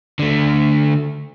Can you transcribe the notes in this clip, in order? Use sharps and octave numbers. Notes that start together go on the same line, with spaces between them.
D3 A3